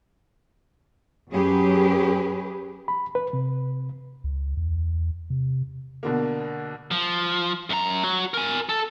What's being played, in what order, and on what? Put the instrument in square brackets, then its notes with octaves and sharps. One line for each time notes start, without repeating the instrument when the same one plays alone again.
[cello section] F#2 F#3 C#4 G4 G#4 B4
[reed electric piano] B5
B4
C3
[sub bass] C#2
E2
C3
[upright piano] B2 D3 A#3
[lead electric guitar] F3
F#2 A#5
F#4 C#5
A#4 G#5
A4